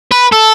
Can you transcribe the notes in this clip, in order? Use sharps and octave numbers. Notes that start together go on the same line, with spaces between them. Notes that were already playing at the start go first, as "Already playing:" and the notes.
B4
A4